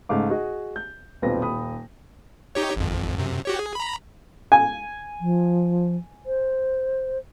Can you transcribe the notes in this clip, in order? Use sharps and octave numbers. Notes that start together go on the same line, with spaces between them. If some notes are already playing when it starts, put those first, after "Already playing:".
G#2 C#3 A3 F5 D6
F#4 G#4 D#5
G6
D#1 B1 C4 F4 B4 A#6
D#1 B5 D#6
D#4 G4 C#5
G#1 F2
F#2 C3
F#4 G4 C#5
G#4
A#5 B5
G#5
F3
C5